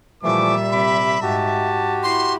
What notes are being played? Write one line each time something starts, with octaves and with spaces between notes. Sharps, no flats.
A#2 E3 F3 G3 A3 E5 D6
C3 B5 D6
G#2 F#4 G4 A5
E4 C6